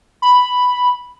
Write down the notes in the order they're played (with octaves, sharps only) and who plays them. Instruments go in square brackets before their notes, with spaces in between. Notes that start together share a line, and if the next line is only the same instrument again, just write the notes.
[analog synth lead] B5